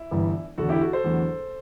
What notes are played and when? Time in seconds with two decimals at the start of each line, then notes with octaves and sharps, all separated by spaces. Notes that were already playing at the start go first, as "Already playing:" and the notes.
Already playing: E4
0.11 G1 G2 E3 G3
0.58 E1 D2 D3 F#4 A4
0.69 E4 G4
0.81 F#4 A4
0.93 A4 C5
1.04 E2 D3 F#3 A3